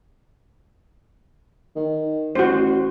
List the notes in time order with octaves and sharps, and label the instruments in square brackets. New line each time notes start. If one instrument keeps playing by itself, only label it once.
[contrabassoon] D#3
[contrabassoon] A1 [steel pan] F#4 C5